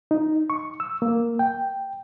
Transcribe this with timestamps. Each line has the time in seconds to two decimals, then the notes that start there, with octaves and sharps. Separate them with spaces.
0.11 D#4
0.50 C#6
0.80 E6
1.02 A#3
1.39 G5